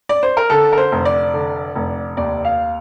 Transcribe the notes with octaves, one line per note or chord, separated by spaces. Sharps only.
D5
C5
A#4
D3 A4
A#4
C5
F1
D5
D3
F1
D#2 D5
F5